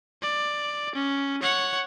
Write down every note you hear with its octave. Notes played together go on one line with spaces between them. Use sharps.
D5
C#4
C#5 F#5